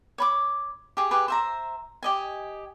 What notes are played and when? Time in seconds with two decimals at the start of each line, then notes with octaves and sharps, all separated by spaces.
0.18 C#5 B5 D6
0.97 G4 G#4
1.11 G4 G#4 B4
1.28 C5 E5 A#5
2.03 G4 D#5 G#5